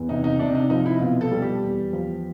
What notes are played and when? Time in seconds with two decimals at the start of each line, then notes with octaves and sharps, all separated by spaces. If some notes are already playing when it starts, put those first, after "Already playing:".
Already playing: E2
0.09 C3 D#4
0.24 D#4
0.39 C3 D4
0.55 D#4
0.70 F3 D#4
0.86 E4
1.01 B2 F4
1.21 A4
1.31 G3
1.42 G4
1.63 E2
1.93 F3